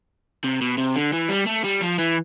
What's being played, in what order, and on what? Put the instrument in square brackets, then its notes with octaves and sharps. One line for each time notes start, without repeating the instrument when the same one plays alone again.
[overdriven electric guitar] C3
B2
C3
D3
E3
G3
A3
G3
F3
E3